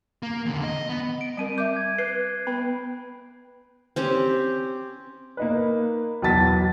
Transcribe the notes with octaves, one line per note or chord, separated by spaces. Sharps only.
A#3
E2 D3
D#5
B3
D7
G3 C4 A#4 D7 D#7
E5 D6 G6
G#6
B4 F#6 C7
B3 B4 B5
C4 C#4 G4
A#3 D#4 B4
B1 E2 F#3 A5 A6 B6